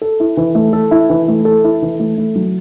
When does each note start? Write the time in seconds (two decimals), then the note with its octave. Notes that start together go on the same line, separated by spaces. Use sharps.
0.02 A4
0.20 E4
0.37 E3
0.55 A3
0.73 A4
0.91 E4
1.10 E3
1.28 A3
1.45 A4
1.64 E4
1.82 E3
1.99 A3
2.18 A3
2.36 F#3